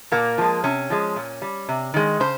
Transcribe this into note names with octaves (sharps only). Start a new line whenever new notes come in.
A#2 A#3
F3 G#3
C3 C#4
F3 G#3
A#2
G3
C3
D#3 G#3
C#3 C5